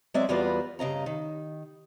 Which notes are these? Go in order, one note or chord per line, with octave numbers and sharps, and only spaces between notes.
F#3 G#3 C4 D5 E5
E2 G3 B3 F4 F#4 B4
G2 C#3 D#5 A#5
D#3